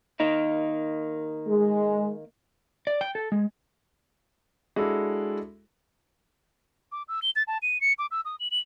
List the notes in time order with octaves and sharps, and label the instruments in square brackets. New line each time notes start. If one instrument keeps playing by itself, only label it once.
[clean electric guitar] D#3 A#3 D#4
[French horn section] G#3
[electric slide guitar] D5
G5
A4
G#3
[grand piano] G#3 D4 E4 F#4 A4
[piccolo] D6
E6
G7
A6
A5
D#7
C#7
D6
E6
D#6
F#7
F#7